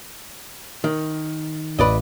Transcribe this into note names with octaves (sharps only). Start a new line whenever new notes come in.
D#3
A1 B4 D5 D#5